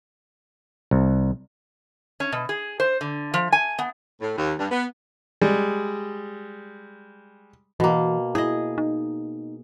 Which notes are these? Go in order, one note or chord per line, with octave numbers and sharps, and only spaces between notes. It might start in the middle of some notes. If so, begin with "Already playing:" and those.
C2
C#4
B2
G#4
C5
D3
F3
G#5
B3
A2
D#2
G2
B3
G3 G#3
B2 E3 A#3
E4 G#4 D#5
D#4